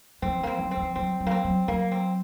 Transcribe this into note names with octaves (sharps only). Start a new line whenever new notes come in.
F3 C4
F3 A#3
C4
F#3
C4
F3
F#3 C4
F#3
A#3
C4
F#3
F#3 A#3
C4